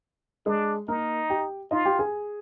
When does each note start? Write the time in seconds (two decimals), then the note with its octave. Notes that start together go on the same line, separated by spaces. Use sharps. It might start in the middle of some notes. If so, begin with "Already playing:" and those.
0.46 G#3 D4 G#4
0.88 A#3 D#4 A#4
1.30 G4 G5
1.71 D#4 F4 D#5
1.85 G4 G5
1.99 G#4 G#5